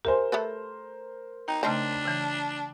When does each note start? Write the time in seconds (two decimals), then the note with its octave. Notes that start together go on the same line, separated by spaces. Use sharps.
0.05 G4 A#4 C5 E5 G#5
0.32 A3 A4 B4
1.48 D#4 G5
1.63 C#3 A3 C4 D4 D#4 G6
2.05 C#3 E3